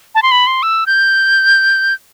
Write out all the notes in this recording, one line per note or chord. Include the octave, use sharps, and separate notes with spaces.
A5
C6
B5
C6
E6
G6